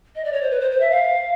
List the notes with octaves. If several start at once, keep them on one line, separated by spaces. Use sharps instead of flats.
D#5
D5
C#5
C5
B4
C5
C5
E5
F5